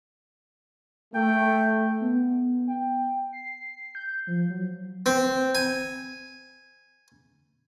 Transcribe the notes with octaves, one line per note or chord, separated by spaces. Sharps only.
A3 G5
B3
G5
C7
G6
F3
F#3
C4
G#5